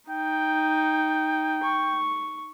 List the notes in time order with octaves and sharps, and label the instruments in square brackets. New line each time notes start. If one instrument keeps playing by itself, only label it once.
[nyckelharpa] D#4 [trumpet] G5
[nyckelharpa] C#6